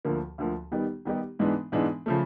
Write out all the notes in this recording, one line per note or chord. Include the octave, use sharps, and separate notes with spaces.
D2 D3 F3 A#3
D2 D3 F3 A#3
D#3 G3 B3 D#4 G4
D#3 G3 B3 D#4 G4
G#2 E3 G#3 B3 D4
G#2 E3 G#3 B3 D4
C#3 F3 A3